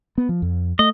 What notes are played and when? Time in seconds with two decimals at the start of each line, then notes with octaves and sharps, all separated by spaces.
0.18 B3
0.29 F3
0.42 F2
0.79 A3 D#5